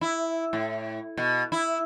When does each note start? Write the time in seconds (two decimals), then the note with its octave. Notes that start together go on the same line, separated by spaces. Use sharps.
0.01 E4
0.53 A2
1.17 B2
1.52 E4